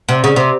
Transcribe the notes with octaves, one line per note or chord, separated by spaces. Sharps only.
C3
C#3
C3